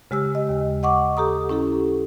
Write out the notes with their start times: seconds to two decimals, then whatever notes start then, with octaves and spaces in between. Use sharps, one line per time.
0.11 C#3 G#3 G4 E6
0.35 D#5
0.49 D#2
0.83 D#5 F#5 C#6 D6
1.17 G4 A4 A#5 D#6
1.49 C#4 E4 G4 A4